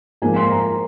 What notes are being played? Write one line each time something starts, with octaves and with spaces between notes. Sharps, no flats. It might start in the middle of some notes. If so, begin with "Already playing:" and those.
G#2 F3 A#3 G#5
C6
A#5